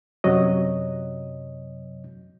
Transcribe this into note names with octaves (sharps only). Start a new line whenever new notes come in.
F#2 C3 F#3 C#5 D#5